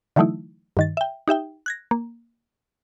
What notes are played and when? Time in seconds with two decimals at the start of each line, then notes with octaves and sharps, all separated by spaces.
0.16 D3 E3 F#3 A3 D#4 E4
0.77 G2 D#3 A6
0.97 E5 G5
1.28 D#4 G4 E5 G5
1.66 F#6 G#6 A#6
1.91 A#3